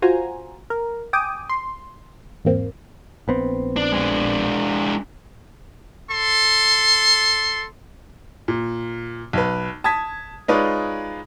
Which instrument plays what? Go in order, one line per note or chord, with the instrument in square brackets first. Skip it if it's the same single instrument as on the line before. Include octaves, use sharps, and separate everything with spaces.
[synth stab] F4 F#4 C5 G#5 A#5
A#4
G5 G#5 D6 D#6
C6
E2 G#2 A#3 C4
[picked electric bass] A#1 B3 C4
[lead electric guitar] D4
G#3 D4
[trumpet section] A4 C6
[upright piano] A#2
B1 B4
A5 D#6 G#6 B6
G#3 D#4 F4 B4 C#5 D5